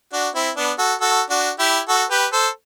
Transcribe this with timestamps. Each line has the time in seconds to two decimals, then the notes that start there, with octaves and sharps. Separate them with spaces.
0.13 D4 F#4
0.35 C4 E4
0.56 B3 D4
0.79 F#4 A4
1.01 F#4 A4
1.30 D4 F#4
1.59 E4 G4
1.88 F#4 A4
2.10 G4 B4
2.32 A4 C5